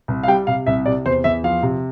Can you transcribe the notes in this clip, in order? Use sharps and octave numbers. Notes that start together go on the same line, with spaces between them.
C2
F5
G3 G5
C3 F5
C2 E5
C3 D5
E2 C5
E2 E5
F3 F5
C3